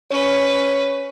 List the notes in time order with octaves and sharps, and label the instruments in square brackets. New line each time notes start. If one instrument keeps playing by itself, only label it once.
[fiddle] C#4 B4 [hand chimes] C#5